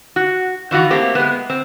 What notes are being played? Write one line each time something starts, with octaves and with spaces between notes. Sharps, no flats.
F#4
D#3 E3 F4 F#4
A3 A#3 C4 G4
G#3 B3
C4